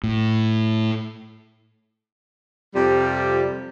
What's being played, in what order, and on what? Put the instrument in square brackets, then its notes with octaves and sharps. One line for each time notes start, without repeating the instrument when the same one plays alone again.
[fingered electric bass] A2
[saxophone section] F2 C3 F3 G3